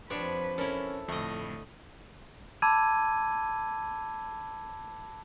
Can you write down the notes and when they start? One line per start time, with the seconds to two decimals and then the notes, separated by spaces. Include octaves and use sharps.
0.10 F2 F3 G3 C4 D4 B4 C#5
0.58 C#4 E4 A4 A#4 C#5
1.08 F2 A2 D3 A3 D#5
2.62 A5 B5 D6 E6 G#6 D#7